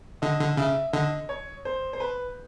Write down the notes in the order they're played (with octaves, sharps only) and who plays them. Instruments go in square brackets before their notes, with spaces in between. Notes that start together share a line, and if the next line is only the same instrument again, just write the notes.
[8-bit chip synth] D3 [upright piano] D#5
[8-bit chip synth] D3
[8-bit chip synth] C#3 [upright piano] E5
[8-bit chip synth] D3 [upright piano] D#5
[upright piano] C#5
C5
C5
B4